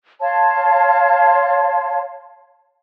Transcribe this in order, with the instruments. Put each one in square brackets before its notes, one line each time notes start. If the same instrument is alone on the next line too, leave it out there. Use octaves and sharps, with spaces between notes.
[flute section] C#5 F5 A5 C6